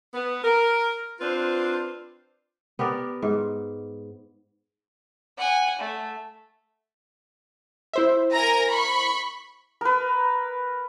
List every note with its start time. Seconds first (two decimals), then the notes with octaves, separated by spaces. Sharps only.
0.14 B3
0.44 A#4
1.21 C4 D4 F4 B4 C5
2.79 B3 G4 A#4 D5
3.22 G#2
5.38 F#5 G#5
5.79 A3
7.93 E4 C5 E5
8.33 A#4 G#5 A#5
8.69 B5 C#6
9.81 A#4 B4